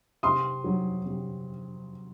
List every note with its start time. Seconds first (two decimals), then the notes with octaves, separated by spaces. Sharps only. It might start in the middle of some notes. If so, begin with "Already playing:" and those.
0.23 C3 C6 D#6
0.64 F#3
1.05 C3